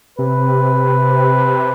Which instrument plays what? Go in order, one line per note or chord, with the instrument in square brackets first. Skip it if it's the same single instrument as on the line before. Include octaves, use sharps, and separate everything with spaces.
[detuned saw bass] C3 [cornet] B4